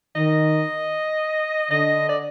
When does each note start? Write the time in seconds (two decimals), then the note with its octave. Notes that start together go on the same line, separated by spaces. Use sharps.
0.15 D#3 D#5
1.70 D3 D#5
2.09 D5